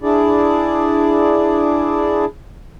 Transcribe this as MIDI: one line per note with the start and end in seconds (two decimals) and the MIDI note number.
0.03 2.25 62
0.03 2.25 64
0.03 2.25 68
0.03 2.25 74